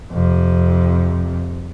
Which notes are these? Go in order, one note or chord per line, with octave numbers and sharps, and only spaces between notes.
F2 C3